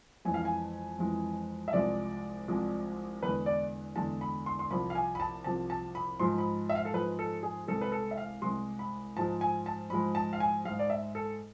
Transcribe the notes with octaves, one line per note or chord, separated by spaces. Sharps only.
F2 E3 G#3 G#5
F5
G#5
F2 E3 G#3
E5
C2 C3 F3 G#3 D5
C2 C3 F3 G#3
E2 D3 G#3 B4
D5
E2 D3 G#3 A5
B5
C6
C6
C2 C3 F3 B5
F5
G#5
B5
A5
C2 C3 F3 A5
A5
B5
G#2 F3 G#3 C6
B5
E5
F5
A4
G#2 F3 G#3 B4
A4
G#4
C2 C3 G#3 A4
B4
A4
E5
F5
C2 C3 G#3 C6
B5
G#2 F3 G#3 A5
G#5
A5
G#2 F3 G#3 B5
A5
F5
G#5
G#2 G#3 F5
D5
E5
A4